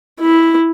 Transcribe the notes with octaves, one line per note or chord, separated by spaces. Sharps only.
E4